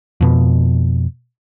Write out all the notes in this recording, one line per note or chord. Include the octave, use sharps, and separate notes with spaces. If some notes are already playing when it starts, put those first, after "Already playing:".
F2 B2